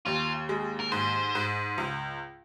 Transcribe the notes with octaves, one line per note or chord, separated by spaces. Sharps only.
D#2 F4
G#3
A#4
G#2 C5
G#2
C#2